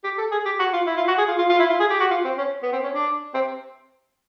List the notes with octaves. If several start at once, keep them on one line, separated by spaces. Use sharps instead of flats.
G4
A4
G#4
G4
F#4
F4
E4
F4
F#4
G#4
F4
F4
F4
E4
F4
G#4
G4
F#4
F4
C4
C#4
B3
C4
C#4
D4
C4